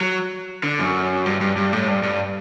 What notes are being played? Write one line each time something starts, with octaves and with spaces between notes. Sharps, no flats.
F#3
D3
F#2
G2
G2
G2
A2
G2
G2